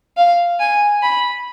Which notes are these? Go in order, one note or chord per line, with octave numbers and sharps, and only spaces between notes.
F5
G#5
B5